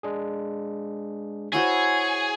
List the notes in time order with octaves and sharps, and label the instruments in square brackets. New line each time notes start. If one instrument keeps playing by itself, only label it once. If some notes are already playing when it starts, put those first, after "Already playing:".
[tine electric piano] G#3 D4 G#4
[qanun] E4 F#4 C5 [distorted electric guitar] G#4 [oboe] C#5